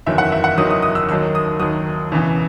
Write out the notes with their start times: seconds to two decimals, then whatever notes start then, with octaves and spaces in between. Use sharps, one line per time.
0.06 F#1 E2 D#3 F#3 E5
0.18 F#5
0.32 E5
0.44 F#5
0.58 F#1 E2 D#3 F#3 D#6
0.70 D#6
0.82 D#6
0.95 E6
1.09 D#2 D#3 F#3 E6
1.35 D#6
1.60 D#2 D#3 F#3 D#6
2.12 E1 E2 C#3 E3